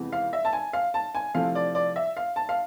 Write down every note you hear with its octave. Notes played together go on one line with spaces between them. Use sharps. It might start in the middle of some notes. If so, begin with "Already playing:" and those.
Already playing: F2 C3 E3 G#3 B3
F5
E5
A5
G#5
F5
A5
G#5
C3 F3 A3 E4 F5
D5
D5
E5
F5
A5
F5